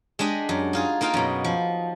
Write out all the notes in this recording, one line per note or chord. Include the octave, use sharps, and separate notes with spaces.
G#3 D4 G4 D#5
F#2
D#4 F4 G#4
A#3 D#4 F4 F5 G5
F#2 B2
F3